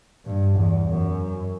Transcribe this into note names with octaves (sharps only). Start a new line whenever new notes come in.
G2
E2
F#2